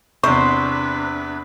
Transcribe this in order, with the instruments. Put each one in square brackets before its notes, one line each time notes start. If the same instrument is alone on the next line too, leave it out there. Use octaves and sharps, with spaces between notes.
[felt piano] E2 C3 [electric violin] D4 B4 [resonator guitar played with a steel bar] C5 [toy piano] C#6